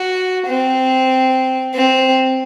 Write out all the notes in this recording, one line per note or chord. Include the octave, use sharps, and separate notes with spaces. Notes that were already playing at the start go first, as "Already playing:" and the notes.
Already playing: F#4
C4
C4